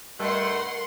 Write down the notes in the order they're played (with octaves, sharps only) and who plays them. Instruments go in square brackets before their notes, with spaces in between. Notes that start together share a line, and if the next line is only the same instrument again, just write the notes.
[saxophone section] G2 A3 [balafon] G3 D#5 [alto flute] A#4 [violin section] F#5 C6